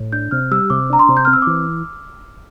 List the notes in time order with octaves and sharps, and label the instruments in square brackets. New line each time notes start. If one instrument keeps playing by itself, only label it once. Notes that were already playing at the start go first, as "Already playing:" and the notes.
Already playing: [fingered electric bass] A2
[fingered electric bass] D4 [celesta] G6
[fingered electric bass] C3 [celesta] F6
[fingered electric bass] G3 [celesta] E6
[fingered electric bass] C3 [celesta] D6
[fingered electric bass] D4 [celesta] A#5
[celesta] C6
[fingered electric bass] C3
[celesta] G6
[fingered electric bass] C4 [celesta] F6
[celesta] E6
[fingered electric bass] E3 [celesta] D6